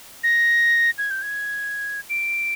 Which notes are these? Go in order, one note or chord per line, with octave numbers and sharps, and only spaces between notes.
A#6
G#6
G6
G#6
D7